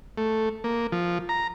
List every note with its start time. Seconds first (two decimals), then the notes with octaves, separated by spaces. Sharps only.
0.18 A3
0.64 A#3
0.92 F3
1.29 A#5